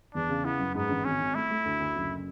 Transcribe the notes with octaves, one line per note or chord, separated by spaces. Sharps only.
E2 D4
C#3
B3 E4
F#2
G#2 B3
A1
G#1 C#4
G#1
A3 E4
A3
D2
D2
F#1